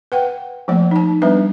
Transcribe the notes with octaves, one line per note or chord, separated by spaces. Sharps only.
B4 F#5 G5
F3 A3 A#3 D5
D#4 A5
G3 B3 D4 B4 E5